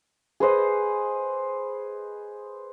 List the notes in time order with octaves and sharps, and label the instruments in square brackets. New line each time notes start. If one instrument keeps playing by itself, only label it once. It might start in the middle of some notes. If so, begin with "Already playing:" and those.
[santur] G#4 B4 C5 D#5